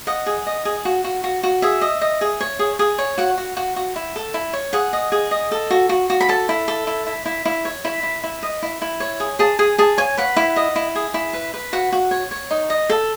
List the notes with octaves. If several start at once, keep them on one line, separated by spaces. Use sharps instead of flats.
D#5 F#5
G#4
D#5
G#4
F#4
F#4
F#4
F#4
G#4 E5
D#5
D#5
G#4
C#5
G#4
G#4
C#5
F#4 F#5
F#4
F#4
F#4
E4
A4
E4
C#5
G#4 F#5
D#5
G#4
D#5
A4
F#4
F#4
F#4
B5
A4 A5
E4
A4
E4
E4
E4
E4
C#5
E4 B5
E4
E4
D#5
E4
E4
C#5
G#4
G#4 A5
G#4 G#5
G#4 A5
C#5 G#5
B4 F#5
E4
D#5
E4
G#4
E4
B4
B4
F#4 F#5
F#4
C#5
C#5
D#4
D#5
A4